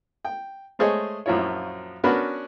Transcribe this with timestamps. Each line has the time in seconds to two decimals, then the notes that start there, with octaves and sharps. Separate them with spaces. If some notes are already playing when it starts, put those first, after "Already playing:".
0.25 G5
0.79 G#3 A3 G#4 C5 C#5 D#5
1.26 A#1 F#2 F3 E4 F4 C#5
2.04 B3 C#4 D4 F#4 A#4 B5